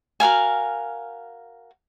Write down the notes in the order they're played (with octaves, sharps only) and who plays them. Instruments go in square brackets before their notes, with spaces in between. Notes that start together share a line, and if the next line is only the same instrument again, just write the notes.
[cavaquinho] F#4 A#4 F5 G#5